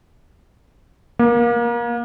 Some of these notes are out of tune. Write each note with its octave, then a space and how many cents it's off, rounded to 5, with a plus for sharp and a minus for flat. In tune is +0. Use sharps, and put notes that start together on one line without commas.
A#3 +25